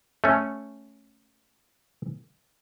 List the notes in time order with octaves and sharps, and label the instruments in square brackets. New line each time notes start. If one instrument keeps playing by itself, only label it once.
[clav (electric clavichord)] A3 C#4